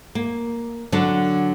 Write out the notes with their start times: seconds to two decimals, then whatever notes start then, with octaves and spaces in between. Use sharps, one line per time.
0.15 A#3
0.92 D3 F#3 D4